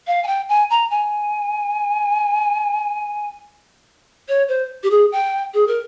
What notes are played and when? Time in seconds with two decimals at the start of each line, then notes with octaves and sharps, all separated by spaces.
0.07 F5
0.24 G#5
0.27 G5
0.49 G#5
0.70 A#5
0.91 G#5
4.29 C#5
4.48 C5
4.83 G4
4.91 G#4
5.12 G5
5.54 G#4
5.67 A#4